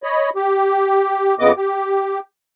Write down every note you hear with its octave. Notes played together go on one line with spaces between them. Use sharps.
C#5 D#5 B5
G4
F2 C#3 B3 D#5 D6
G4